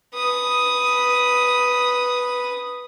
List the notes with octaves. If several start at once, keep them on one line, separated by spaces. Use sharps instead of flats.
B4 D#6